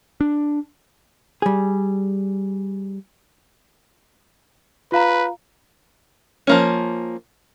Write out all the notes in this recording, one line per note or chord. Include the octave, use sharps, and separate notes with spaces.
D4
G3 G#4
F4 B4 F5 A#5
F3 A#3 C#4